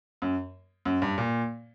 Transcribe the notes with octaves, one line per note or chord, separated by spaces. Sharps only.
F#2
F#2
G2
A#2